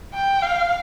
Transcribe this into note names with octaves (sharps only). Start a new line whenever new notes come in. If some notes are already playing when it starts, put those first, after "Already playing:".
G5
F5